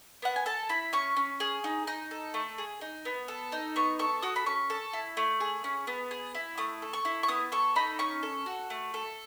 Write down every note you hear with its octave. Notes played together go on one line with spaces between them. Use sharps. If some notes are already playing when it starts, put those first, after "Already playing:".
B3 F#5
G#5
A4 A5
E4 B5
C#4 C#6
C#4
G#4
D#4
D#4
A4
A3
G#4
D#4
B3
A4
D#4
B3 C#6
A4 C#6
F#4 D#6
B5
C#4 C#6
A4
E4
A3
G#4
C#4
B3
G#4
E4
A3 D#6
A4
C#6
E4
C#6
B3 D#6
A4 C#6
D#4 B5
C#4 C#6
A4
F#4
A3
A4